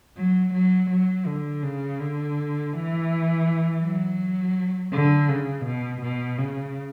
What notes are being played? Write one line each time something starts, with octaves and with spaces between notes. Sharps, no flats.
F#3
F#3
F#3
D3
C#3
D3
E3
F#3
D3
C#3
B2
B2
C#3